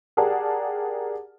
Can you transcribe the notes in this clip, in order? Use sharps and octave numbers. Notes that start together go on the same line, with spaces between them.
G4 G#4 A#4 D5 F#5 A5